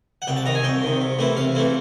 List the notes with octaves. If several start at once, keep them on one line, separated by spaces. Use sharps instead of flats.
F#5
C2 G5
A5
C3 D#3 A#5
G#5
C2 G5
C3 D#3
C3
E3 A3 C4 E4
C3 F5
E3 A3 C4 E4